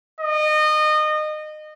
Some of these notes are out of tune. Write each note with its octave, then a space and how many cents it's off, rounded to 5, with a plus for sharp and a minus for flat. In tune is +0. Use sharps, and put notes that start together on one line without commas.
D#5 -25